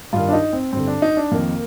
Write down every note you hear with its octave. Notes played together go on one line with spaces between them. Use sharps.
G2 D#3 F4
D4
D#4
C4
G2 D3 C4
D4
D#4
D4
F2 D#3 A#3